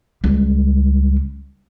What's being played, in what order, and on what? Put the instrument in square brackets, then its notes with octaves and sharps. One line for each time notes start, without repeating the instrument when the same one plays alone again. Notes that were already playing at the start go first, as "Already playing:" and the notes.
[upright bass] C#2 G3